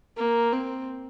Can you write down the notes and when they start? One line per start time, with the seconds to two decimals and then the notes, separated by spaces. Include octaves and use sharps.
0.17 A#3
0.52 C4